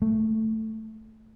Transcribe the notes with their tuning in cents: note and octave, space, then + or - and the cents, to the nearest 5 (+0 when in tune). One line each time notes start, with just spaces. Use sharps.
A3 +5